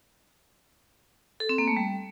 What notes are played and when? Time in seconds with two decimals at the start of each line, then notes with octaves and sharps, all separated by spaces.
1.40 A4
1.49 C4
1.58 A#3
1.68 A3
1.77 G3